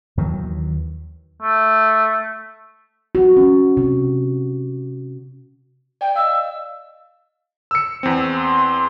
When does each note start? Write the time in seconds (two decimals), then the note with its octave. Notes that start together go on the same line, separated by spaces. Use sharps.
0.17 D#2 D#3 E3 F#3
1.42 A3
3.15 F#4
3.37 C#4
3.77 C3
6.01 D5 G5
6.15 D#5 F5 E6
7.71 E6 C#7
8.03 E2 C4
8.36 C6